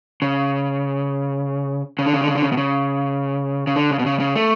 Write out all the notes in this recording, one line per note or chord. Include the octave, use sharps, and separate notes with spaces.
C#3
C#3
D3
C#3
D3
C#3
D3
C#3
B2
C#3
C#3
D3
C#3
B2
C#3
C#3
A3